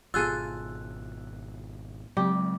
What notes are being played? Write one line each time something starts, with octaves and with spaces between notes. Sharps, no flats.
G#1 B2 F4 G#4 A4 E6 F#6
C#3 F#3 G#3 C4 G4